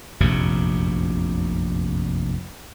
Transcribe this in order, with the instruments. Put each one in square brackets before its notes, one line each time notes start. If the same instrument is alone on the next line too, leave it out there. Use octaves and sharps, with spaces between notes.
[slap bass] F1 A#1 F#2 C3